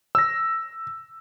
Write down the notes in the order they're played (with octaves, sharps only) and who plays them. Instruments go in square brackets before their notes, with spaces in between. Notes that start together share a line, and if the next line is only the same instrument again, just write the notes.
[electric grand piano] E6 A#6